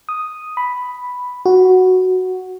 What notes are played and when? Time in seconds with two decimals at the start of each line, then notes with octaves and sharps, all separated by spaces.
0.09 D#6
0.57 B5
1.46 F#4